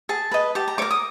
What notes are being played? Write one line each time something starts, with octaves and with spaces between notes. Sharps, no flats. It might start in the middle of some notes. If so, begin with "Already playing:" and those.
G#4 A5
B4 D#5
G4 A5
A#5
A#4 C#5 D6
D#6